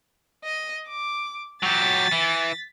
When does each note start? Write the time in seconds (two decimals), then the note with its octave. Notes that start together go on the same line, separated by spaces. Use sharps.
0.44 D#5
0.88 D6
1.63 F#3 G4 A6 B6
2.12 E3